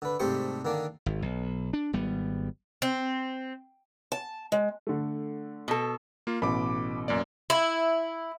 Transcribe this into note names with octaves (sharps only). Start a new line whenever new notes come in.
D3 B4
G#2 C3 G3 A3 C5 C#6
D3 D#3 A#3 D4
G#1
B1
D4
G#1 G3 B3
C4
A5
G#3
D3 A3
B2 A4
A#3 F4
A1 B2 B5 D6
F#2 A#3 D5
E4